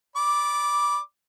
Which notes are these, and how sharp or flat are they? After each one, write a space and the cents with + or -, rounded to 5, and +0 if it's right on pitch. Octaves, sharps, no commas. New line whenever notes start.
D5 -20 B5 -20 D6 +0